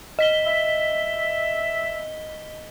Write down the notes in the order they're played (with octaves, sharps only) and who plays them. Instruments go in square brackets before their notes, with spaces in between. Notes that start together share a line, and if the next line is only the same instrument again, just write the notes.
[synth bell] D#5 B6 G7
[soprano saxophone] E5